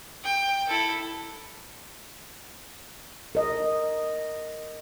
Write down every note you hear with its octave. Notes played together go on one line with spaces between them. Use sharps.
G5
E4 A4
A#4 D#5